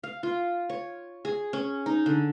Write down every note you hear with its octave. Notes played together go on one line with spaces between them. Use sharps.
F5
F4
C#5
G#4
C#4
D#4
D3